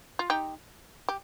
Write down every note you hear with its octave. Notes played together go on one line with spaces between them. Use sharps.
F4
D#4 G4
G4